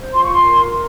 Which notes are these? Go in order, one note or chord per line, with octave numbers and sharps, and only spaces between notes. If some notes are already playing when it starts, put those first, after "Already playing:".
Already playing: C5
F4 C6
C#6
C6
A#4